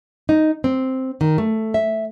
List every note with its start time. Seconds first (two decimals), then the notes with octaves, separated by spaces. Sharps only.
0.29 D#4
0.64 C4
1.21 D#3
1.38 A3
1.74 E5